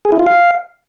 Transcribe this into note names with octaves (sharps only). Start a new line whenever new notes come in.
G#4
E4
F4
F5